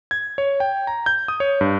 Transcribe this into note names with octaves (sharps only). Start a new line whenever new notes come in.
G#6
C#5
G5
A#5
G6
D#6
C#5
G2